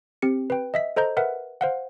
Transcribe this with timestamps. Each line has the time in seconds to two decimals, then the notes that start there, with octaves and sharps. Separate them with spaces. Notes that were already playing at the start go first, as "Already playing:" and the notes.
0.22 C4 G4 C#7
0.50 B4 G5
0.74 D#5 E5 B6
0.96 A4 C5 D#5 A#5 G6
1.17 A#4 B4 E5 F#5
1.61 C5 F5 F#5